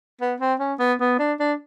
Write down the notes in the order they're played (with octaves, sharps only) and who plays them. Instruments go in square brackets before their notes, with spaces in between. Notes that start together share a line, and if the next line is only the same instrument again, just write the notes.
[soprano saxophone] B3
C4
C#4
B3
B3
D4
D4